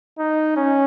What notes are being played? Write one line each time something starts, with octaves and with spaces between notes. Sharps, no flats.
D#4
C#4